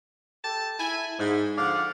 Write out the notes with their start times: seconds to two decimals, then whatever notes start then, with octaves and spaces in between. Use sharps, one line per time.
0.44 G4 A4 A5
0.80 E4 G#5
1.19 G#2
1.58 D3 F3 D5 F5 F#5